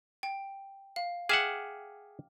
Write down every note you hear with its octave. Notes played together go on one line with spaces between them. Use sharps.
G5
F5
G#4 E5 F#5 G5 D6 F6